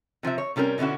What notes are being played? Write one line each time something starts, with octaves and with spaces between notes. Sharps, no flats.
C3 F3 C5 E5
C#5
C3 G3 C#4 G#4 A#4
B2 D3 C#4 E4 F#4